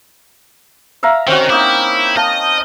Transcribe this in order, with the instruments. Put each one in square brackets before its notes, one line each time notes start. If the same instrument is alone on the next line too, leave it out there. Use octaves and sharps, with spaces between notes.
[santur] E5 F5 A#5
[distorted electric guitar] D#3 [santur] C4 C#4 F#4
[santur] A#3 D#4 G5 [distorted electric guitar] E4
[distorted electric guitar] D#5 [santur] F5 A5